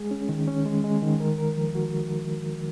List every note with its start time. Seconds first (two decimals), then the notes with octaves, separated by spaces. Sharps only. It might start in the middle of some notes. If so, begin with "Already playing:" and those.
Already playing: G#3 G#4
0.11 C#4
0.29 D#3
0.47 C#4
0.66 G#3
0.84 G#3
1.02 D#3
1.20 A#4
1.38 A#4
1.57 F3
1.75 F#4